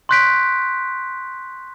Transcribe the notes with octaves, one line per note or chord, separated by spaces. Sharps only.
C6 C#6 F#6 G6 B6 D7